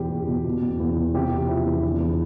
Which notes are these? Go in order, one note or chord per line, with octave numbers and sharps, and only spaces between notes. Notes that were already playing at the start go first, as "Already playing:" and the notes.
Already playing: E2 B2 G4
E2
B2
B2
E2
E2
B2
C3 G4
E2
F3 E4
E2
D3
E2